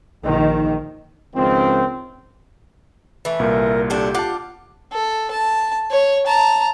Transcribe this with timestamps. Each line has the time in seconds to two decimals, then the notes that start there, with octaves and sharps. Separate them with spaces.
0.24 A#1 D#3
1.35 C#2 D#3 F3 C4
3.25 E3 A3
3.39 C2 A#2 A#4
3.90 D4 F#4 G4 A4
4.15 F4 F#5 A5 D6
4.92 A4
5.31 A5
5.91 C#5
6.27 A5 A#5